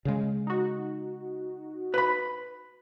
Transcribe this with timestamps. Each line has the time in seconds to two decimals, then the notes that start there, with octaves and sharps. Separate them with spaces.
0.05 C#3 G#3
0.47 D#4 F#4
1.94 B4 B5